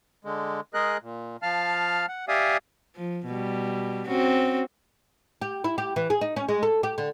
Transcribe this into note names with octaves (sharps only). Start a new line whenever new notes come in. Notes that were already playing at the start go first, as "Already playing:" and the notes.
D3 G#3
G#3 G#4 A#4 D#5 F#6
A#2
F3 F5 A5 F6
F#5
G4 D5 E5 F5 G#5 D#6
F3
B2 G3
C4 C#4 F#4
G4
E4
G4
E3
G#4
D#4
C#4
G#3
A4
G4
D3